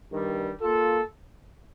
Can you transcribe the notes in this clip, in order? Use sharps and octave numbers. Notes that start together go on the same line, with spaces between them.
G2 D#3 G3
A#3 F4 A4